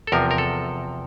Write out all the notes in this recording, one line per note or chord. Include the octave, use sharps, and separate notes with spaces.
A4
E2 C3 F3 A#4
A#4
A4